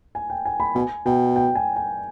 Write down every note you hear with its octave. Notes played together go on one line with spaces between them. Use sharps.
G#5
G5
G#5
B5
B2 G#5
B2 G5
G5
G#5
G#5